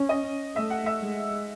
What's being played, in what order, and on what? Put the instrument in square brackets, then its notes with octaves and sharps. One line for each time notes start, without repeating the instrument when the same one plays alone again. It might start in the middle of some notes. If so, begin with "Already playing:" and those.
Already playing: [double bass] C#4
[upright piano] D#5
[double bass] A3 [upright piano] E5
[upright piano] F#5
E5
[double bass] G#3